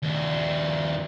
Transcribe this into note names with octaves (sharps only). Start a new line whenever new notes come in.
D#2 D4